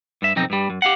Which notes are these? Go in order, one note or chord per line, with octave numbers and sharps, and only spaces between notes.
G2 E5
B1 F2 C4 D#4
G2 G3
F#2
G4 F5 F#5